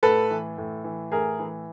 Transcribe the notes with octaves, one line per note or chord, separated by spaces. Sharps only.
A2 A4 B4
E3
A2
E3
A2 G#4 A#4
E3